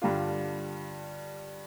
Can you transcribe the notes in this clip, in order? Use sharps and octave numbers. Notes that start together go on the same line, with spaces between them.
G2 D3 G3 D4 F4